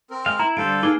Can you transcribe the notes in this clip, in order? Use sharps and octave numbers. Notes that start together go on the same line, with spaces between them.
C4 A#4
G#3 F5
E4 A#5
D3 G3 A4 C5 F5 D7
A#3 D#4 G#4 B4 D6 G7